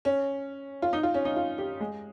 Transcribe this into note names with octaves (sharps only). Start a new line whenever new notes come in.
C#4
F4
D#4
F4
C#4
D#4
F4
G4
G#3